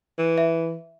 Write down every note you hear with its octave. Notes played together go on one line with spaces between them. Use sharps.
E3
E5